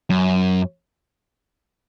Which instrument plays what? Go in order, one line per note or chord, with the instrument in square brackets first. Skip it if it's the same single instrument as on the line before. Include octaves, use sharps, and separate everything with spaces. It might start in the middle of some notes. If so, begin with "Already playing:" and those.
[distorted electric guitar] F#2